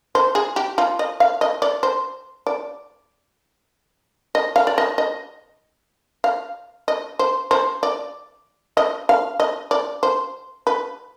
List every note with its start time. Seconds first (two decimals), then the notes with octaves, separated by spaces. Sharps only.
0.15 C5
0.35 G#4
0.56 G4
0.78 F4
0.99 D#5
1.20 F5
1.41 D#5
1.62 D5
1.83 C5
2.47 D5
4.35 D#5
4.56 F5
4.67 D5
4.78 D#5
4.98 D#5
6.24 F5
6.88 D#5
7.19 C5
7.51 C5
7.83 D5
8.77 D#5
9.09 F5
9.40 D#5
9.71 D5
10.03 C5
10.67 B4